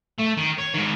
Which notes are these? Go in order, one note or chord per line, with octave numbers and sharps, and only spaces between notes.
A3
D#3
C#5
G#2 D#3